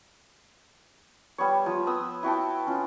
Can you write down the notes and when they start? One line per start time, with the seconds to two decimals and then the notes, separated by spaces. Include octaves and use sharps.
1.38 G3 B3 C#5
1.66 F3
1.87 B3 D#6 E6
2.23 E4 F#4 G5 A5
2.67 C#4 F4